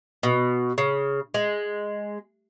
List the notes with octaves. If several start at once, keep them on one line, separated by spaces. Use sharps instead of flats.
B2
C#3
G#3